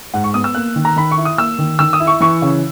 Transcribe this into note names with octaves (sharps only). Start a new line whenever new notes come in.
G#2 F#5
C#6
B3 D#6
E6
A#3 F#6
D#3
A#5
D#3 B5
C#6
E4
D#6
A#3 E6
D#3
D#3 E6
D#6
E4
C#6
E3 C#6
C#3